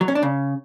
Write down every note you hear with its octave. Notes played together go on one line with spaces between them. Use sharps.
F#3
C#4
D4
C#3